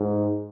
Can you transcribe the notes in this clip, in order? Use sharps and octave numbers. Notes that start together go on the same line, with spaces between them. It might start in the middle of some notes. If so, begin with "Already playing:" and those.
Already playing: G#2